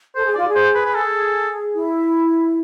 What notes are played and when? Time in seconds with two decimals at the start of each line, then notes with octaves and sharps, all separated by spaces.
0.15 A4 C5
0.26 G#4
0.35 F4 D5
0.48 G#4
0.55 C5
0.75 B4
0.86 B4
0.95 A4
1.75 E4